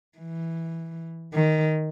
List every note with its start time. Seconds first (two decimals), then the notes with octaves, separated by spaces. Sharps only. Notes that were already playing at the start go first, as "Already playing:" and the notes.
0.18 E3
1.34 D#3